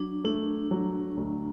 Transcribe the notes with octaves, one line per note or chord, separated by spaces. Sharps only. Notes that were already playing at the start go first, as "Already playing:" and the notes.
Already playing: F#3 D4
A3 D4
F#3
D2